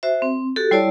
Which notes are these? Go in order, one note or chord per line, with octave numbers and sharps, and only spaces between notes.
F#4 C5 E5
C4
F#4 G4 A4
G3 E4 C#5 D5 A5